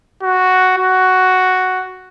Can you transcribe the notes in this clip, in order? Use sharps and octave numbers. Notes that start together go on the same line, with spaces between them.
F#4
F#4